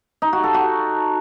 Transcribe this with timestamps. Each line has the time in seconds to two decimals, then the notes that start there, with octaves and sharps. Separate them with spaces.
0.22 D#4
0.33 F#4
0.44 A4
0.54 F#4